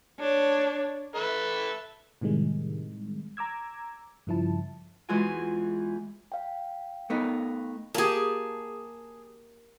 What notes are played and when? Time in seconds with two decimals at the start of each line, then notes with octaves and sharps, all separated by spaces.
0.19 D4 C#5
1.15 A4 B4 E5
2.21 A2 C3 D#3 G3 G#3
3.37 A#5 D6 E6 G#6
4.27 G2 C#3 F3 E4 A5
5.09 E2 E3 G#3 F4 F#4 G#5
6.32 F5 G5
7.10 A3 B3 D#4
7.95 A#3 G4 G#4 A5